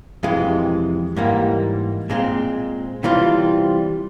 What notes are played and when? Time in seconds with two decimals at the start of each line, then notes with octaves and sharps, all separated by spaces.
0.23 F2 C3 E3 G#3
1.16 G#2 E3 G3 A#3
2.10 A#2 G#3 C4
3.03 C3 E3 G3 C4 F4